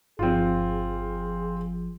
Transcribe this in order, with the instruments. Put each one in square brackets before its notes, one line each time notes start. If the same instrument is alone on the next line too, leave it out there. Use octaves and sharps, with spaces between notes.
[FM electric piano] G1 F3 [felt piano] C4 F4 [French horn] G#4